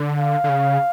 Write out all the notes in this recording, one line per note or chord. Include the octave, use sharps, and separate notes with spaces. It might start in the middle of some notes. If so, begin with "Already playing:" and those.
Already playing: D3
F5
D3
C#3